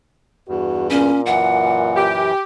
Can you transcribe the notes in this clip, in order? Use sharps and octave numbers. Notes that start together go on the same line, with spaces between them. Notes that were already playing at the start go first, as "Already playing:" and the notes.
E2 G2 F#4
A#2 C#4
F#2 E3 F#5
G4